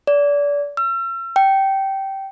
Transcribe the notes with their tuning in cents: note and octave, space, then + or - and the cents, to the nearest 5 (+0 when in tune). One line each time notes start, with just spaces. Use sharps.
D5 -30
E6 +40
G5 -15